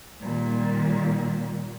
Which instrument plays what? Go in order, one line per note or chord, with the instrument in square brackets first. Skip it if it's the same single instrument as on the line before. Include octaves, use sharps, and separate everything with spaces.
[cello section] A#2 D#3 G3